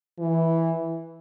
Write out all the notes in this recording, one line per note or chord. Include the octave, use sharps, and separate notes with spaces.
E3